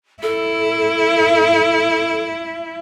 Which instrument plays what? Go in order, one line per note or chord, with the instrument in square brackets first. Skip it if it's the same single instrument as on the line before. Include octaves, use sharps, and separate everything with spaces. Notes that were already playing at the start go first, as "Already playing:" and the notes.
[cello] E4 [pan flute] A4